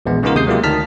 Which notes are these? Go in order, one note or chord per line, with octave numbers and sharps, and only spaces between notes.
A#1 E2 G#3 B3
C#3 G#3 B3 D#4 F4 A#4
D#2 C3 G#3 D#6 G6 C7
F#3 G#3 A#3 E4 F4 G4
D2 D#3 A5 F6 B6